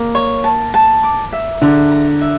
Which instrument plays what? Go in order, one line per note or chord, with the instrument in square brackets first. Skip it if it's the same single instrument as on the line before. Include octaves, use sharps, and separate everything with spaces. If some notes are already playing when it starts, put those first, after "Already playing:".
Already playing: [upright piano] A#3
[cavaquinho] C#5
A5
A5
D6
E5
[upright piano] D3 [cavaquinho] A#5
[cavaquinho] A#5
E5